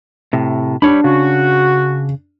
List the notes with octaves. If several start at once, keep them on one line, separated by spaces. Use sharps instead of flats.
A2 C3
G3 D4 C#5 B5
C#3 F#4